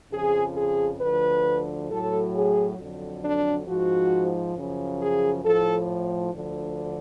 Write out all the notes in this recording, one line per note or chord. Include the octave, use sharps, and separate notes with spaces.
F2 C#3 F3 G#4
G#4
D2 D3 F3 B4
A2 F#3 A4
G#4
F2 D3 F#3
D4
G#2 F3 F#4
F#2 C#3 F3
G#4
A2 F3 A4
D2 D3 F3